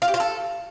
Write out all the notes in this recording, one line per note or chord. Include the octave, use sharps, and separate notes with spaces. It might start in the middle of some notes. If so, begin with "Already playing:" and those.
F4
G4
F4
A4